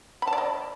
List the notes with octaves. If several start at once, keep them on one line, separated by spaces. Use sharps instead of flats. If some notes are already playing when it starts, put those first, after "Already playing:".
B5
A5
D5
D#5